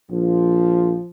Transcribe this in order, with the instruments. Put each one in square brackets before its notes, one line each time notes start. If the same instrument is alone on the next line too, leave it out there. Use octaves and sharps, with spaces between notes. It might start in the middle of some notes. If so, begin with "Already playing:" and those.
[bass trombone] A#1 [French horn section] F3